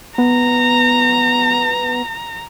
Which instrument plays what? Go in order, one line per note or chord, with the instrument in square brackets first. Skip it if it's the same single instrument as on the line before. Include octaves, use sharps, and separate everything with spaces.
[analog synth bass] B3 [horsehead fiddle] A#5